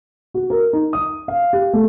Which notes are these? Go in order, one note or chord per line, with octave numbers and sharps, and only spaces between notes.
F#4
A#4
D#4
D#6
F5
G4
A3